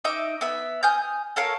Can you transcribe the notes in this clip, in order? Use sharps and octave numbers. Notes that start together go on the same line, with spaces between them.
D#4 D#5 E5 D6
B3 E5 B5
G#5 D#6 F6 G6
A4 A#4 C#5 F5